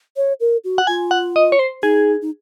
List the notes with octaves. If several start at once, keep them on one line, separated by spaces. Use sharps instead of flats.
C#5
A#4
F#4
F#5
F4 G#5
F#5
D#5
C#5
C5
D#4 G#4
D#4